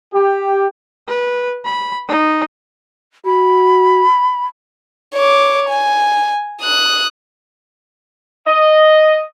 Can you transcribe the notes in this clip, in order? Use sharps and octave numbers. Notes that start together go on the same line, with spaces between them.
G4
B4
B5
D#4
F#4 B5
C#5 D6
G#5
D#6 F#6
D#5